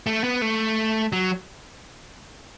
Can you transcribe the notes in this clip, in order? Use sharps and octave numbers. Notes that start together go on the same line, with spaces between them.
A3
B3
A3
F#3